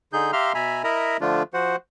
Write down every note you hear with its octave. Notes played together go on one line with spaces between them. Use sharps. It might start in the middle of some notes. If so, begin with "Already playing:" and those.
D3 D#4 G#4 G6
G4 E5 F5 A#5 C6 F6
B2 E5 G#5 A#5 B5
E4 A#4 D#5 E5 A#5 B5
D3 F3 A3 D4 F4
F3 F#4 C5 F#5